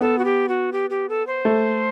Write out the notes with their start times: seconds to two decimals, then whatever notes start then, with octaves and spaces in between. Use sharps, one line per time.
0.01 B3 A4
0.18 F#4
0.25 G4
0.48 F#4
0.72 G4
0.90 G4
1.09 A4
1.27 C5
1.45 A3